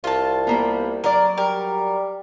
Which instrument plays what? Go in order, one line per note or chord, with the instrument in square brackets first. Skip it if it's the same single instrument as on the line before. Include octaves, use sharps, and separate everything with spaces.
[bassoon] C2 [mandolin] F4 A5
[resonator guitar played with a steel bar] G3 A#3 B3
[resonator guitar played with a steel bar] F#3 D5 [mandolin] A#4
[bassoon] G3 [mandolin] A#4